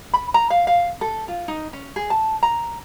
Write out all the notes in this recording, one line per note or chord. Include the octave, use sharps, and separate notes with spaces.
B5
A#5
F5
F5
A4
F4
D#4
C#4
G#4
A5
A#5